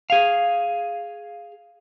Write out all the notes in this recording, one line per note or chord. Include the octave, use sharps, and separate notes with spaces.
G#4 F5